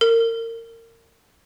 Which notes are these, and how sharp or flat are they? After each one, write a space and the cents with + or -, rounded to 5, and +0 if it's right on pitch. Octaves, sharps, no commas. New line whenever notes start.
A#4 -30